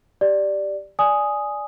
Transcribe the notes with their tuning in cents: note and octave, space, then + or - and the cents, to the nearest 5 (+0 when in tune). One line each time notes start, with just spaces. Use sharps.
G4 +0 D5 +5
D5 +0 G#5 +5 D#6 +0